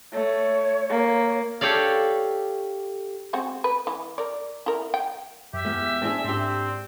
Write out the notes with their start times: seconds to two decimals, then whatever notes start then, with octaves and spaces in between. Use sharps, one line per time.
0.13 A3 C#5
0.90 A#3
1.61 G4 A4 C#5 D5 F5
3.33 G#3 C4 F#4
3.64 B4
3.87 E3
4.18 A#4 D5
4.66 E4 A#4
4.94 G5
5.53 F#2 G4 E5
5.65 E2 G#3
6.02 C4 D4 G#4 A5
6.24 G#2 C4 D4 G4